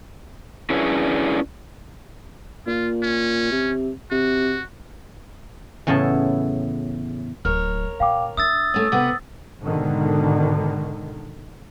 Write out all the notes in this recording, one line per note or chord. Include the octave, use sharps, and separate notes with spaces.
C#4 D4 E4 G#4 B4 C#5
A#2 F4
C#4
C3
C3 F#4
E2 A2 C#3 E4 C#5 A5
D1 A#4 C#5 F6
A#2 F5 G5 D6
D4 E5 D#6 E6 A6
A3 C#4
C3 B3 B4 D6
G#2 B2 D3 D#3